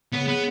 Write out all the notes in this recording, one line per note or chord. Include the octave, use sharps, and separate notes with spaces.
C#2 C#3 G#3 B3 C#4
B3